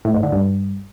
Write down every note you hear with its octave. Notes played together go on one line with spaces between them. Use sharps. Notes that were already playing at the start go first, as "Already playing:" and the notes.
A2
G#2
D3
G2